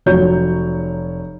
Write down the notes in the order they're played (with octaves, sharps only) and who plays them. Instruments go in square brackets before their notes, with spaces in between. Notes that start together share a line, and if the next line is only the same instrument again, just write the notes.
[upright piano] F1 F#3 C#5 G6